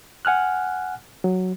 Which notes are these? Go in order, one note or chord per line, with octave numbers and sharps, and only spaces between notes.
F#5 G#5 F6 F#6
F#3